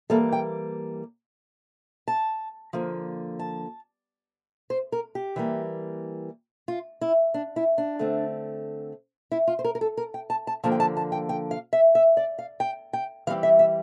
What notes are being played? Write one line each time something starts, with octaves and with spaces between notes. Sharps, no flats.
E3 G3 A#3 A4
G5
A5
D3 F3 A#3
A5
C5
A#4
G4
E3 G3 A#3
F4
E4
D4
E4
D4
D3 A3 C4
E4
F4
C5
A#4
A#4
A4
A#4
G5
A5
A5
D3 F3 A#3 A5
G5
A5
A5
G5
G5
F5
E5
E5
D5
F5
G5
G5
E3 G3 C4 F5
E5
E5